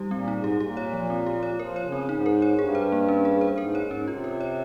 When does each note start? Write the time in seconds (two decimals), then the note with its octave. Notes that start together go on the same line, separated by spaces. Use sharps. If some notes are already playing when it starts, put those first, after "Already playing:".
Already playing: G3 D#4 G4
0.11 A#2 C4
0.28 D#4
0.36 G#2
0.44 G4
0.60 A#2 G4
0.77 C#5
0.93 F3
1.10 C4
1.27 G4
1.43 C#5
1.59 F3 A#4
1.76 C#5
1.84 C#3
1.92 C4
2.09 G#2 D#4
2.26 A#4
2.42 C#5
2.58 G2 G#4
2.75 C5
2.92 A#3
3.09 C#4
3.25 G#4
3.41 C5
3.58 G#2 A#4
3.75 C#5
3.83 G#2
3.91 C#4
4.07 C3 F4
4.24 A#4
4.41 C#5